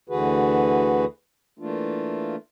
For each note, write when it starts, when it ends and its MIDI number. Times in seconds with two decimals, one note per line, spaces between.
0.09 1.05 38
0.09 1.05 50
0.09 1.05 52
0.09 1.05 66
0.09 1.05 68
0.09 1.05 71
1.59 2.36 52
1.59 2.36 57
1.59 2.36 58
1.59 2.36 62
1.59 2.36 65